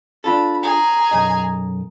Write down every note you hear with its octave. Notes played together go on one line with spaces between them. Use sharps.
D4 F4 A4 B5
G#4 A#5
B1 F#2 D#5